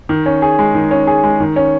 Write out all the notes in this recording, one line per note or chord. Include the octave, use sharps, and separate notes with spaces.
D#3
C#4
G#4
G#3
D#3
C#4
G#4
G#3
D#3
C#4